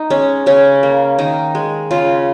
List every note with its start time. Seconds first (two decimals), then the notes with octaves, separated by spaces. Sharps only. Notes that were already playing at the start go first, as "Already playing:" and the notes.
Already playing: D#4
0.10 G#3 C#4
0.46 C#3 C#4
0.83 A#3
1.18 D#3 D#4
1.55 G#3
1.91 C#3 F4